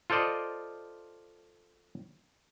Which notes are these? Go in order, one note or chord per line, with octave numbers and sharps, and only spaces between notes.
F4 A4 C5 D5 D#5